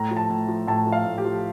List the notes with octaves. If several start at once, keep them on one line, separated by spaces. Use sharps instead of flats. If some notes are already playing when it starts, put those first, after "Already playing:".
Already playing: A2 A#5
F3
A5
A2
F3
A2 A5
F3
F5
A2
G4
F3